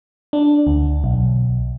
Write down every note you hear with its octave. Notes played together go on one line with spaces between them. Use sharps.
D4
D2
B1